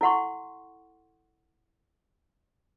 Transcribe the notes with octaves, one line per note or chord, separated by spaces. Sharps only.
E4 A4 F#5 C6 C#6